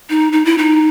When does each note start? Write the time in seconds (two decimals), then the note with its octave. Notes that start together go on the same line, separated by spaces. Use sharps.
0.10 D#4
0.33 D#4
0.45 E4
0.58 D#4